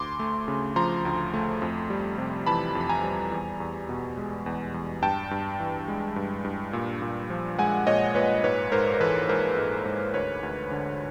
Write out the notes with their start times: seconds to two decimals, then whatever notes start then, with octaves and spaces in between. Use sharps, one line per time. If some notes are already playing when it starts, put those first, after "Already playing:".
Already playing: D2 C6 D6
0.19 A3
0.48 C#3
0.76 F3 A#5 C6
1.05 D2
1.34 A3
1.62 F2
1.90 G3
2.18 C3
2.46 E3 A5 B5
2.75 F2
2.81 B5
2.89 G#5 A#5
3.03 G3
3.32 E2
3.60 E2
3.89 B2
4.18 G#3
4.46 E2
4.74 E2
5.02 G2 G5 A5
5.31 G2
5.60 E3
5.88 G#3
6.16 G2
6.45 G2
6.73 A#2
7.02 A#2
7.30 F3
7.59 G#3 F#5 G#5
7.87 A#2 C#5 D#5
8.15 A#2 B4 C#5
8.44 G#2 B4 C#5
8.72 G#2 A#4 C5
8.94 A#4
9.00 E3 A4 B4
9.29 G#3 A#4 C5
9.58 G#2
9.86 G#2
10.14 D2 B4 C#5
10.43 D2
10.71 D3